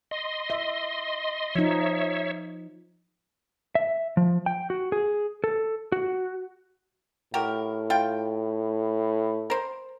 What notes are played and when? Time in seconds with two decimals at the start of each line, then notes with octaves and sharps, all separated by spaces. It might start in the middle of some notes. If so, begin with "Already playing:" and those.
0.11 D#5 C6
0.50 E5
1.55 F3 D#4 C#5 E5
3.75 E5
4.17 F3
4.46 G5
4.70 F#4
4.92 G#4
5.44 A4
5.92 F#4
7.34 A2 F#4 G4 A#4
7.90 F4 G5
9.50 A#4 C5